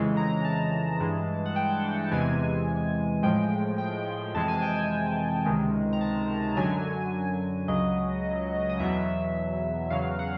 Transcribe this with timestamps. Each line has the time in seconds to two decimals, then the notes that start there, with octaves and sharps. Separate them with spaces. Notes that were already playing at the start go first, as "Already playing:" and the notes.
Already playing: F2 C#3 E3 G#3
0.17 A#5
0.45 A5
1.00 G2 E3 G#3
1.46 F#5
1.56 G5
2.12 E2 C3 E3 G#3 G#5
3.23 A2 F3 G#3 G5
3.78 G5
4.34 F2 C3 E3 G#3 A5
4.48 G#5
4.62 G5
4.75 G#5
5.46 C#2 C3 D#3 G#3
5.93 A#5
6.01 A5
6.56 F#2 D3 F#3 G#5
7.68 C#2 C#3 F#3 D#5
8.69 D#5
8.79 E2 B2 F#3 E5
9.90 E2 C#3 F#3 F5
10.19 F#5